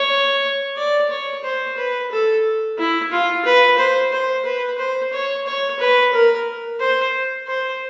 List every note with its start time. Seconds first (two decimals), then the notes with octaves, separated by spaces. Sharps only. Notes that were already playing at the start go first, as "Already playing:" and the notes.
Already playing: C#5
0.77 D5
1.10 C#5
1.43 C5
1.77 B4
2.11 A4
2.78 E4
3.11 F4
3.45 B4
3.78 C5
4.12 C5
4.45 B4
4.79 C5
5.13 C#5
5.46 C#5
5.79 B4
6.13 A#4
6.80 C5
7.47 C5